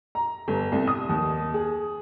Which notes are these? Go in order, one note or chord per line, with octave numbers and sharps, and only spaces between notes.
A#5
G1
C2
D#6
D#2
G#4